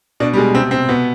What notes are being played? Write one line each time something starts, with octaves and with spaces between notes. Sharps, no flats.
B2 D4
G3
B2 G#3
C3 C4
C3 C4
B2 B3